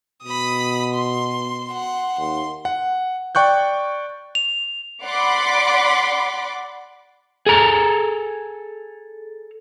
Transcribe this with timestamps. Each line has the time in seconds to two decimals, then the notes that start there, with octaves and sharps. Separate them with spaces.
0.24 B2 B5 D#6
0.94 C6
1.71 F#5 C6
2.18 D#2 C6
2.65 F#5
3.35 D5 G5 C#6 F#6 G6
4.35 F7
5.05 D5 F#5 B5 C6 D6
7.46 G#4 A4 A#5